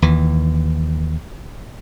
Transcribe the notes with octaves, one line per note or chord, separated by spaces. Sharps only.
D#2 E3